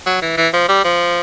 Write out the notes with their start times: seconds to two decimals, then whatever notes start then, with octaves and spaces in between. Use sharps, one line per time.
0.06 F#3
0.22 E3
0.37 E3
0.54 F3
0.69 G3
0.84 F3